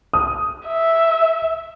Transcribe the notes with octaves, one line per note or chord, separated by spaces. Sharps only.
D#6
E5